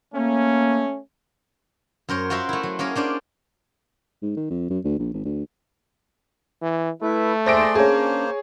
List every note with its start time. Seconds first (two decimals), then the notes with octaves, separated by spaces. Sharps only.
0.14 A3 A#3 C#4
2.09 F#2 A#4 C5 C#5
2.30 F4 F#4 A#4 C5 E5
2.49 A3 E4
2.63 F#3
2.79 A#3 C#4 G#4 A#4
2.95 C#4 D4 C5 D5
4.23 G#2
4.37 D#3
4.51 F2
4.70 F#2
4.84 D2
4.99 A#1
5.14 G#1
5.26 D2
6.62 E3
7.02 A3 E4 B4 E5
7.46 D#2 G#4 C5 D5 E5 C6 A#6 D7
7.75 A#3 C#4 D4 G#4 C5 C#5